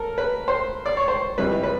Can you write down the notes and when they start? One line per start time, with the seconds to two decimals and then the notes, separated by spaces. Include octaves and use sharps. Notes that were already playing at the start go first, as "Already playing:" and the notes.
Already playing: A4 A#4
0.18 B4
0.48 C5
0.86 D5
0.97 C#5
1.08 C5
1.38 F2 C3 E3 G3 B4
1.63 B4